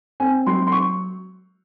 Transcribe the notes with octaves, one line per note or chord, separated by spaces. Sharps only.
C4 G#5
F#3 C6
C6
C#6